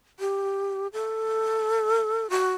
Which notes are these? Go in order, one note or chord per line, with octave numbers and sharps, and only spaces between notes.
G4
A4
F#4